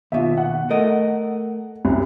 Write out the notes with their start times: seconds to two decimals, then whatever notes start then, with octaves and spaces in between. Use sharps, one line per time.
0.12 D#2 B2 F4 E5
0.37 F#5
0.70 A3 A#4 D#5
1.85 C2 F#2